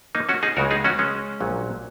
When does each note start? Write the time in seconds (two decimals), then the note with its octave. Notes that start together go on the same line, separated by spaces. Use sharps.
0.15 A#3 D#4
0.29 C#4 F#4
0.43 D#4 G#4
0.57 C#2 C#3 G#3 F#4 A#4
0.71 D#4 G#4
0.84 C#4 F#4
0.99 G#3 C#4
1.40 A#1 A#2 F#3